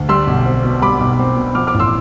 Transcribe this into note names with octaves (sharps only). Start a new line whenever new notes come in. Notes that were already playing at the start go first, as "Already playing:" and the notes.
Already playing: D2
G3 C6 E6
B1
C4
B2
G3 B5 D6
B1
C4
B2
F3 D6 F6
D6 F6
A1
C6 E6